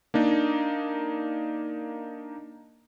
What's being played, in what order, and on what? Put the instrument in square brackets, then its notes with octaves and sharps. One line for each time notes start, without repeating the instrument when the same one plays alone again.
[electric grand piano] A#3 D4 D#4